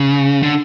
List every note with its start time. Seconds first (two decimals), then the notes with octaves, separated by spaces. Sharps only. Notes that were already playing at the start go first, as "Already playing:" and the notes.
Already playing: C#3
0.43 D3